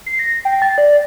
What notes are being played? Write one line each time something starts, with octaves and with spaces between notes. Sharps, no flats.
C7
A#6
G5
A6
D5